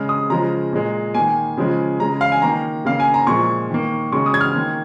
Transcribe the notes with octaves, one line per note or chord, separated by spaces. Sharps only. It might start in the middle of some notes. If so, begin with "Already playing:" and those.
Already playing: C#3 G#3 F6
D#6
C#3 F3 G#3 A#5
A#2 G#3
D#3 A#3 G#5
C#3 F3 G#3
C#3 G#3 A#5
F5
G#5
D#3 A#3 A#5
C#3 A#3 F5
G#5
A#5
A#2 F3 G#3 C#6
D#3 A#3
C#3 G#3 C#6
D#6
G#6
F6
D#3 A#3